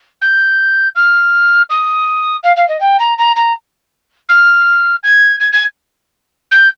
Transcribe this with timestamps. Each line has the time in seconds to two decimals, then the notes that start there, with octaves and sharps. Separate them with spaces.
0.21 G6
0.95 F6
1.70 D#6
2.43 F5
2.56 F5
2.68 D#5
2.80 G5
2.99 A#5
3.18 A#5
3.36 A#5
4.29 F6
5.03 G#6
5.40 G#6
5.52 G#6
6.51 G6